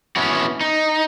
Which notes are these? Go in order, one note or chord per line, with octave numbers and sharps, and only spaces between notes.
B3 C#4 E4 F#4
D#4